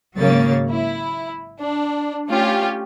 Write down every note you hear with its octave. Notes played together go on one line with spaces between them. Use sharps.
G#1 C#3 F#3 A#3 C#5 A6
E4
D4
A3 C#4 F4 G4